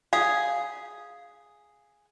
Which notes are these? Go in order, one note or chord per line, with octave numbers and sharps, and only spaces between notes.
G#4 F5